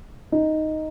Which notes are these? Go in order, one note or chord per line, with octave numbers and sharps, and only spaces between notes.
D#4